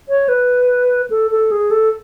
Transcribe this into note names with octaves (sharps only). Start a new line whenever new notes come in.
C#5
B4
A4
A4
G#4
A4